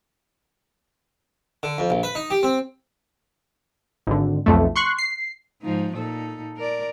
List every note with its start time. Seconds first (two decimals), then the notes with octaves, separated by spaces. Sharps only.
1.63 D3
1.78 F2
1.90 A#1
2.03 B4
2.15 D#4
2.30 G4
2.43 C4
4.07 G#1 D3
4.46 B1 F2 A3
4.76 C6 C#6 F#6 C7
4.98 C7
5.62 G#2 F3 D#4
5.95 A#2 D#4 A4
6.57 A#4 D5